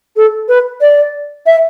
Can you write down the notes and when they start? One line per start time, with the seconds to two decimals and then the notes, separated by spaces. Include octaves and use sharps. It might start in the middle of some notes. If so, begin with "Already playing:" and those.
0.16 A4
0.48 B4
0.81 D5
1.46 E5